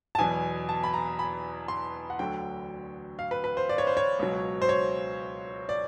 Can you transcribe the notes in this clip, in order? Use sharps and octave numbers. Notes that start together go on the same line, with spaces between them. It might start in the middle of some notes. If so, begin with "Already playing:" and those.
A5
E2 B2 F#3 G#5
A5
B5
A#5
B5
C6
F#5
D2 D3 F#3 G5
F5
B4
B4
C5
D5
C#5
C5
C#5
C#2 B2 F#3
C5
C#5
D5